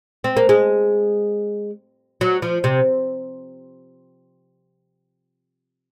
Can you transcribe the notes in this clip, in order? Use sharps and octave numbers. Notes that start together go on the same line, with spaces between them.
C4
A#3
G#3
F#3
F3
C3